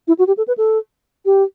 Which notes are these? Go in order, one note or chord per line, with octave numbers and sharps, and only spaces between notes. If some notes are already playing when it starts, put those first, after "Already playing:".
E4
F#4
G4
A4
B4
A4
G4